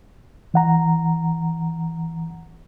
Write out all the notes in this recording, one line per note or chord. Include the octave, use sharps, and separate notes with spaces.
E3 F#5 A#5